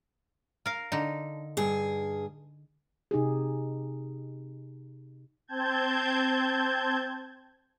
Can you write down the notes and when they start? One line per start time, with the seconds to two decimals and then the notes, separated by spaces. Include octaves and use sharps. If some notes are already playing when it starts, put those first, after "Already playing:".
0.66 A#4 F5
0.92 D3 D#4
1.57 G2 G#4
3.11 C3 D#4 G4 G#4
5.48 C4 A5 G6 G#6